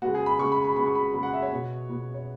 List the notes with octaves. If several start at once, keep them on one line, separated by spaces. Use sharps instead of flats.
C#3 G#3 B3 F#4
G#4
B5
C#3 G#3 B3 C#6
B5
B5
C#3 G#3 B3 B5
C#6
B5
C#3 G#3 B3 B5
F#5
E5
C#5
B2 B3
B2 B3
C#5